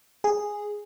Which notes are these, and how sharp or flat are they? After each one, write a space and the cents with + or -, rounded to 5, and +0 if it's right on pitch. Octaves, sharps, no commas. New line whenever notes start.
G#4 -5